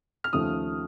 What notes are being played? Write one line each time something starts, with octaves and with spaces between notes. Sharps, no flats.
F6
D#2 C#3 F3 A3 D#6